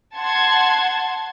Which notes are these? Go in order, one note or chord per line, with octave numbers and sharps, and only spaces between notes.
F#5 A5 C6 G#6